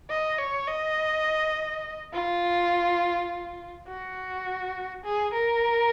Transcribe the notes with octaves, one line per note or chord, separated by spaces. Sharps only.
D#5
C#5
D#5
F4
F#4
G#4
A#4